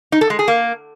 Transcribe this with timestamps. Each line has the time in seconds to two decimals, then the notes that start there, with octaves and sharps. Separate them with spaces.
0.12 D#4
0.21 A4
0.30 G#3
0.39 G#4
0.48 A#3